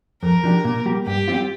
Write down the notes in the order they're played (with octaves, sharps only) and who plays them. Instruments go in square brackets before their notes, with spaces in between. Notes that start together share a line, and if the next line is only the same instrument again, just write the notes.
[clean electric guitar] F2 [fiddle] A#4
[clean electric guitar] F3 D4 G4
A#2
G3 A#3 G4
[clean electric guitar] G2 [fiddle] G4
[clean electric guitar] G3 C4 F4